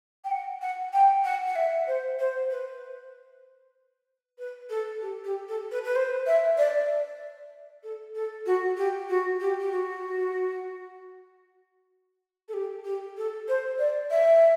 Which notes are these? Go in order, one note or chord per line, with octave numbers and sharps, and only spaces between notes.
G5
F#5
F#5
G5
F#5
F#5
E5
C5
C5
B4
B4
A4
G4
G4
A4
B4
B4
C5
E5
D5
A4
A4
F#4
G4
F#4
G4
G4
F#4
A4
G4
G4
A4
C5
D5
E5